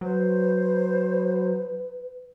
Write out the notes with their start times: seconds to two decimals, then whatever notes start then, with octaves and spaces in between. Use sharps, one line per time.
0.01 F#3 B4 C5